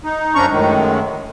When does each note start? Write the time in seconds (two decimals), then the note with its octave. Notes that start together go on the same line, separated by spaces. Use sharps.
0.04 D#4
0.35 F#2 F3 C#4 D4 A#5 C#6
0.49 F#2 A2 D#3 G#3